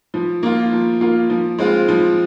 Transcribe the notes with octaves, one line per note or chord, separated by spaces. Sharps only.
F3
A#3 F4
F3
A#3 F4
F3
G#3 C4 F4
F3